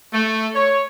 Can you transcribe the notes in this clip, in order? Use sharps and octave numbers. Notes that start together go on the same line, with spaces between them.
A3
C#5